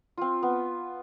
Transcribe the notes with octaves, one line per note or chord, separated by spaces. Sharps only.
C4 F4
B3